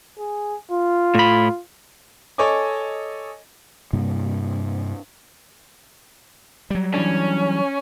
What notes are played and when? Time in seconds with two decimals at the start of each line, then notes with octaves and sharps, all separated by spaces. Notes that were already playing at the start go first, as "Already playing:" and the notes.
0.19 G#4
0.71 F4
1.15 A2 B5
2.38 A4 C#5 D#5 G#5 D6
3.93 G2 C3 G3 A#3
6.70 F#3 G3
6.94 E3 C#4 D4